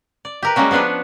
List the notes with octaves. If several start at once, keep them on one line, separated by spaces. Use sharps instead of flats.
D5
G4 A#4 B4
G3 G#3 A#3 C#4 F#4
F3 B3 D4 B4 C#5